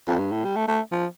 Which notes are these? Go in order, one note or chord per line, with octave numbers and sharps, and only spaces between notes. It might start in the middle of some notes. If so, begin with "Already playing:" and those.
F2
G2
A2
G3
A3
A3
F3